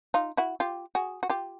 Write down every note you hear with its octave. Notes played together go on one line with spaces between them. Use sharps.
D#4 F4
E4 F#4
F4 G4
F#4 G#4
F#4
F4 G4